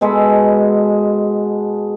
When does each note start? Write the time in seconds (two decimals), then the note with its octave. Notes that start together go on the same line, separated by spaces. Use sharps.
0.01 B2 G#3 A4 B5